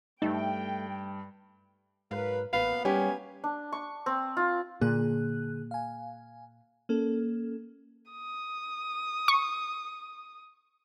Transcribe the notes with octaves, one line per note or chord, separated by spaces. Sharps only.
G2 A3 D#4 G5
G#2 F#3 A#4 B4 F5
A1 F#2 A#3 B3 B4 F5
G3 C#4 G4 G#5
D4
C#6
C4
F4
A#2 D3 G#4 F#6
F5 G#5
A#3 C#4 A4
D#6
C#6